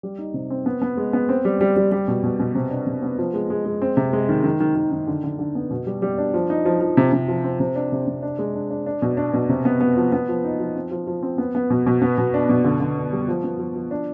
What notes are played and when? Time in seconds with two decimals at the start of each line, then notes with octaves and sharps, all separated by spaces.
0.03 G3
0.18 D#4
0.34 C3
0.50 C4
0.66 B3
0.82 B3
0.97 G#3
1.13 B3
1.29 C4
1.45 G3
1.61 G3
1.76 G3
1.92 G3
2.08 B2
2.24 B2
2.40 B2
2.55 C3
2.71 D4
2.87 C3
3.03 B3
3.19 F3
3.34 G#3
3.50 G#3
3.65 G#3
3.82 C4
3.97 C3
4.13 G#3
4.29 D#3
4.44 D#3
4.60 D#3
4.75 D#3
4.92 D#3
5.07 D3
5.24 D3
5.39 D3
5.55 B3
5.71 B2
5.87 G3
6.02 G3
6.18 D4
6.34 F3
6.50 D#4
6.65 F3
6.81 F3
6.97 C3
7.13 C3
7.28 F3
7.44 C4
7.60 C3
7.76 D4
7.92 C3
8.07 C3
8.23 D4
8.39 G#3
8.54 D4
8.71 D4
8.86 D4
9.02 B2
9.17 D4
9.34 B2
9.49 C3
9.65 B3
9.81 B3
9.96 F3
10.12 B3
10.29 F3
10.44 D#4
10.60 F3
10.76 C4
10.91 F3
11.07 F3
11.23 C4
11.38 B3
11.55 B3
11.70 B2
11.87 B2
12.02 B3
12.18 B2
12.34 D4
12.49 B2
12.65 D3
12.80 D3
12.96 D4
13.12 G3
13.28 F3
13.44 B3
13.59 F3
13.76 F3
13.91 D4